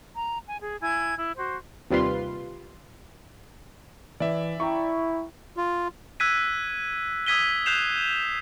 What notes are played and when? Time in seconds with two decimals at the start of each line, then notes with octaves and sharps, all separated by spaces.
0.14 A#5
0.47 G#5
0.61 G#4
0.82 E4 G#5 G#6
1.17 E4
1.36 F#4 C5
1.91 D#2 C3 G3 F4 B4 C6
4.20 E3 D5 E5
4.60 E4 G5 A#5 C#6
5.57 F4
6.20 E6 F#6 G#6 B6 D#7
7.26 D#6 E6 G#6 B6 D#7 G7
7.66 F#6 G6 C7 E7 F7